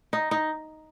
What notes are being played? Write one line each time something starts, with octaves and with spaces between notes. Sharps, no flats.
D#4
D#4